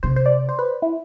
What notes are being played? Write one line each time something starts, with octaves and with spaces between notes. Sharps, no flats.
C3 C5
C5
D5
C5
B4
E4